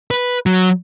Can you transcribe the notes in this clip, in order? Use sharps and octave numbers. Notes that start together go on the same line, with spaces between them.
B4
F#3